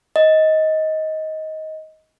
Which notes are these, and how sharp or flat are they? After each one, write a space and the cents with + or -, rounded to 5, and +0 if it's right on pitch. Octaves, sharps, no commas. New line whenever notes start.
D#5 +15